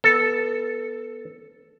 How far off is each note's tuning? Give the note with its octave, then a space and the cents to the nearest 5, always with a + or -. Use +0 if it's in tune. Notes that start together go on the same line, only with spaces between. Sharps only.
B3 -20 A4 +0